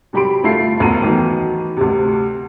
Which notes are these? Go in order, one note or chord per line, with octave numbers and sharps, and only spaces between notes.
C3 F#3 G4 B5 C6 D7
G1 A3 E4 F4 C7
E1 D2 B2 A#5 D#7
D#3 E3 F#3 A3 B3
D2 C3